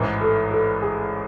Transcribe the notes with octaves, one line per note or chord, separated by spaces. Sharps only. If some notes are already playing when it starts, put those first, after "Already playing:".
Already playing: A1 G#2 E3 A#4
A4
A4
G#4